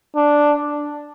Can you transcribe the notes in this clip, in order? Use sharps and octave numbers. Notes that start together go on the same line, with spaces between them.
D4